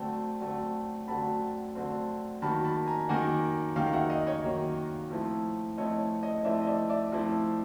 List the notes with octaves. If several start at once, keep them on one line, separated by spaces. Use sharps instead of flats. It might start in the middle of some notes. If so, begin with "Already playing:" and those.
Already playing: D3 F#3 A3 C4 G5 A5
D3 F#3 A3 C4
D3 F#3 A3 C4 A5 B5
D3 F#3 A3 C4
D#3 F#3 A#3 A5 B5
A5 B5
G#5 A#5
D#3 F#3 A#3 F#5 G#5
D#3 F#3 A#3 F5 G5
F5
E5 F#5
D#5 F5
C#5 D#5
D#3 F#3 A#3
F3 A3 C4 E4
F3 A3 C4 E4 C#5 D#5
C#5 D#5
F3 A3 C4 E4 D5 E5
D#5
D5 E5
D5 E5
F3 A3 C4 E4